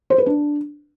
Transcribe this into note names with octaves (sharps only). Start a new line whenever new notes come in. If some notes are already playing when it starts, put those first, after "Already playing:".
C5
B4
D4